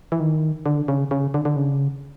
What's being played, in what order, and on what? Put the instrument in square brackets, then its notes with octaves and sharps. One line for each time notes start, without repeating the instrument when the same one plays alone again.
[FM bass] E3
D#3
D3
C#3
C#3
D3
D3
C#3